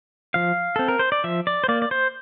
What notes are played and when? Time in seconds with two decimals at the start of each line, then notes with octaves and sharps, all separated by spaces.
0.34 F3 F5
0.76 C4 A4
0.88 A#4
0.99 C5
1.12 D5
1.24 F3 E5
1.47 D5
1.64 C5
1.68 A#3 D5
1.82 D5
1.91 C5